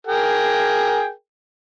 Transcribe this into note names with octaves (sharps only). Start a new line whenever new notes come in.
G#4 A#4 G5